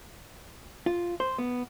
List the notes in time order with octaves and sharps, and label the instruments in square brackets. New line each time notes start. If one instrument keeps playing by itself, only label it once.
[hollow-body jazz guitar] F4
C5
B3